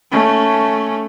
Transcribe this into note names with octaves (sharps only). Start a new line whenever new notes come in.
A3 C#4